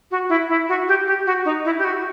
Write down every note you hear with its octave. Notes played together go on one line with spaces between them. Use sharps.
F#4
E4
E4
F#4
G4
G4
F#4
D#4
E4
G4
F#4